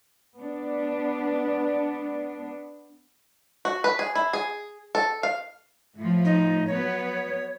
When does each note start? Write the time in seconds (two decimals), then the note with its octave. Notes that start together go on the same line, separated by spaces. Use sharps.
0.36 B3 D4
3.65 F#4
3.84 B4
3.99 G#4
4.15 E4
4.33 G#4
4.95 A4
5.23 F5
5.96 A2 F3
6.25 D#4
6.67 F#3 B3 C#5